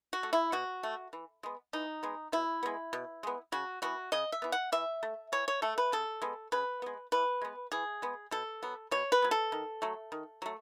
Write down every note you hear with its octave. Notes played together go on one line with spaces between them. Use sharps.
F#4
A3
E4
B2 F#4
A3
E3
G#3 B3
E3 D#4
G#3 B3
B2 E4
G#3 B3
B2
G#3 B3
C#3 F#4
E3 B3 F#4
C#3 D#5
E5
E3 B3
F#5
E3 E5
A3
E3 C#5
C#5
A3 A4
B4
C#3 A4
G#3 B3
C#3 B4
G#3 B3
E3 B4
G#3 B3
E3 G#4
G#3 B3
B2 A4
F#3 B3
B2 C#5
B4
F#3 B3
A4
D#3
F#3 A3
D#3
F#3 A3